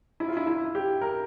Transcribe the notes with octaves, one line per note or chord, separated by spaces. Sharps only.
E4
F4
E4
E4
G4
A#4